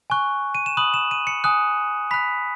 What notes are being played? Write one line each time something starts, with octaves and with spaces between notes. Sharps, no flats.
G#5 C#6 F#6
D#7
E7
B5 D#6 F#6 F#7
E7
D#7
C#7
G#5 D#6 F#6
B5 F#6 B6